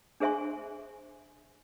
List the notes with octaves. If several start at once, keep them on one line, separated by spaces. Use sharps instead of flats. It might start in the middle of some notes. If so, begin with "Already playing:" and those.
D4 G#4 C5 E5 G#5 C6